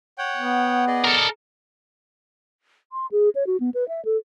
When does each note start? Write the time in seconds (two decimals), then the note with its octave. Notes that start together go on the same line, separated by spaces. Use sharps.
0.18 C#5 F#5 G5
0.37 B3
0.87 G#4 D5 D#5
1.05 A4 A#4
2.92 C6
3.12 G#4
3.35 C#5
3.47 F#4
3.60 B3
3.74 B4
3.88 E5
4.05 A4